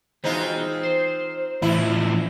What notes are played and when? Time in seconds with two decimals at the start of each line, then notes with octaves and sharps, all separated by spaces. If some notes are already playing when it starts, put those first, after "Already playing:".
0.24 E3 G#3 C4 D#4 F4 F#4
0.83 C5
1.62 A2 E3 F3 E4